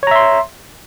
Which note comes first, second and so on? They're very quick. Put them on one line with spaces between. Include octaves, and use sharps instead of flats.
C#5 A#5 E5 C6